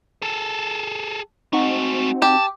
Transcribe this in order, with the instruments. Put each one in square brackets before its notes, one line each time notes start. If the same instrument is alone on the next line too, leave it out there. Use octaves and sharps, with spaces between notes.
[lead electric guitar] G#4 A4
[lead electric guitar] G#3 A3 [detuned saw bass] C4 [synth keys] D#4 F#4
[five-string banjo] G4 [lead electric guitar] A5